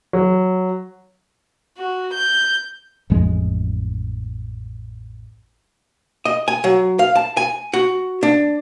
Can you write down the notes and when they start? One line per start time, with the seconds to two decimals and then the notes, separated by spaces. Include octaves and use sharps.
0.13 F#3
1.77 F#4
2.14 G6
3.10 A1 F2 F3 G#3
6.25 D#5
6.48 G#5
6.64 F#3
6.99 F5
7.15 A5
7.37 G#5
7.73 F#4
8.23 D4